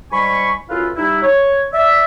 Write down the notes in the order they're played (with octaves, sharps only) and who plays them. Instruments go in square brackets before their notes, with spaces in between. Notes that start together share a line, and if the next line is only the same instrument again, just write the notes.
[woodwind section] G#2 G3 G#5 B5 C#6
F#2 E4 F4 A4 B4 F5
G3 D#4 E4
C#5
D5 E5